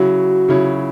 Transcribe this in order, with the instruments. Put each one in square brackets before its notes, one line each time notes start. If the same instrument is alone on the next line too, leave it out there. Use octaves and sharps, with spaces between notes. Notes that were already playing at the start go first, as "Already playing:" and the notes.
Already playing: [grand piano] C#3 F#3 E4 C#5 [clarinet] F#4
[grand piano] C#3 F#3 E4 C#5